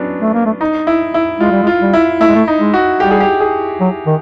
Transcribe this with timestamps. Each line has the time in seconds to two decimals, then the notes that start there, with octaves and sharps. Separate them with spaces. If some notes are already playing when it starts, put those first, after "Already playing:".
Already playing: F#3 B3 C#4 D4
0.21 A3
0.34 A#3
0.46 A3
0.61 D#4
0.87 E4
1.14 E4
1.40 G#3 F4
1.51 G3
1.63 G#3
1.67 F4
1.81 G3
1.93 E4
2.20 A3 E4
2.27 G#3
2.35 A3
2.48 D#4
2.60 G#3
2.74 F#4
3.00 G3 G4
3.11 G#4
3.20 G4
3.40 G#4
3.81 F#3
4.06 D#3